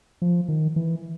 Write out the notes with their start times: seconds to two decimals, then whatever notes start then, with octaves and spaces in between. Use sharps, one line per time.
0.22 F3
0.48 D#3
0.76 E3